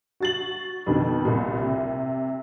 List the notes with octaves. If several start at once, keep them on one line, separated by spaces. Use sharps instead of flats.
F#4 A6 F#7
F2 B2 D#3
C2 A#2
C3